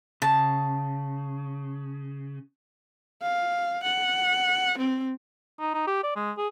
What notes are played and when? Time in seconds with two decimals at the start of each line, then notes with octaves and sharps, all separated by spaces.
0.22 C#3 A5
3.22 F5
3.83 F#5
4.78 C4
5.60 D#4
5.74 D#4
5.87 G4
6.04 D5
6.16 G#3
6.38 G#4